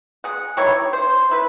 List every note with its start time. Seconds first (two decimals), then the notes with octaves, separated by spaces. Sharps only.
0.24 G#4 F#5
0.57 D#3 G3 E4 C#5
0.71 G3
0.93 C5
1.31 E4 B4